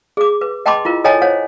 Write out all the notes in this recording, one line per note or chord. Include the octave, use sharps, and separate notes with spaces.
G#4 D6
B4
D#5 G5 A5 B5 C6 D6
E4 F4 A#4
A4 C#5 D#5 G5 G#5 A#5
C5 C#5 F#5